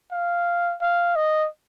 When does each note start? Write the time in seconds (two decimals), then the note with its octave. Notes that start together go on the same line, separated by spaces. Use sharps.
0.12 F5
0.81 F5
1.16 D#5